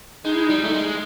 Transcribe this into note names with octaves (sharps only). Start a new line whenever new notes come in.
G#3 D#4
E4
D#4
G3
A3
G#3